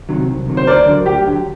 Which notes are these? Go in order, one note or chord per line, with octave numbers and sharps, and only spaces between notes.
C3 D#3 F#3
C2
C3 D#3 F#3
C5
D2 A#4 D5
D3 F#3
D2 G4
D3 F#3